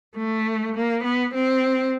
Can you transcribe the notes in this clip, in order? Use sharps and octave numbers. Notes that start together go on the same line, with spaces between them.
A3
A#3
B3
C4